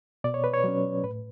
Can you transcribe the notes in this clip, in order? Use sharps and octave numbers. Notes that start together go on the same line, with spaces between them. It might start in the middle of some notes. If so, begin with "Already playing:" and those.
B2 D5
C#5
B4
C#5
F#3 C#4
A2 B4